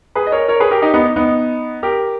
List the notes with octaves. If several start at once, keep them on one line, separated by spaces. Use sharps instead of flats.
G#4 B4
D#5
A#4 C#5
A#4 C#5
G#4 B4
G4 A#4
D#4 G4
B3 D#4
B3 D#4
G4 A#4